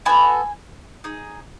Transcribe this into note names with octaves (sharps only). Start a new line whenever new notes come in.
B3 F#4 A4 G#5 B5
D#4 G#4